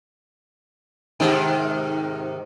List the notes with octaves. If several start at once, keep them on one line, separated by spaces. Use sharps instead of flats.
G#2 C3 D#3